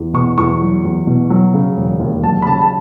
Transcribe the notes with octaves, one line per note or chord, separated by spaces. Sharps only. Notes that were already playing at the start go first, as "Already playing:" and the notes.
Already playing: E2
B2 C#6
E2 C#6
F#3
E2
B2
F#3
C#3
E1
D#2
F#3 A5
B5
C#3 A5
A5